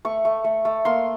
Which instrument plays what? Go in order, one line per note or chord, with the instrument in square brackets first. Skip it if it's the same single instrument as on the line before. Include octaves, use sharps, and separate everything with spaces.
[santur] A3 C#6
A3
A3
A3
A#3 C6